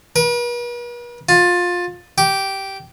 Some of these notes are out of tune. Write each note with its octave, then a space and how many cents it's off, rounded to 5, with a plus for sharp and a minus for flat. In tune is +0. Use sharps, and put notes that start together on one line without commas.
B4 -45
F4 +20
G4 -10